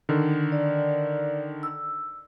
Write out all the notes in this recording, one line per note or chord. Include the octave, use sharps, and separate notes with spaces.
D3 D#3
D5
E6